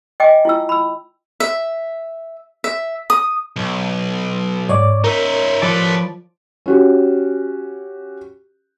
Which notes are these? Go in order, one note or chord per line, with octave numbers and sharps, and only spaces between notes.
D#5 G5 G#5 D6
E4 F4 E6
B5 E6
E5
E5
D#6
B1
G#2 C#5 D5 D6
D#4 A#4 E5
F3 A4 B4 D5
C#4 F#4 G4